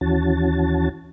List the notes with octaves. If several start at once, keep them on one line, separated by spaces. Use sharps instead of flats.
D#2 E3 C#4 F#4 A5